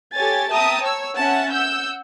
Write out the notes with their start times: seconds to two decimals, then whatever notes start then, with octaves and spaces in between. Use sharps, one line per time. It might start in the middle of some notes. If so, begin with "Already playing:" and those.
0.14 G4 A4 C#5 G#5 A6
0.50 E5 G5 A5 A#5 D#6
0.83 C#5 E6
1.17 C#4 E5 F#5 A5
1.52 F#5 E6 G6